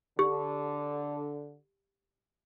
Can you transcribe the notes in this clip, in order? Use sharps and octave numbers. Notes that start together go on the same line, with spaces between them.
D3 G4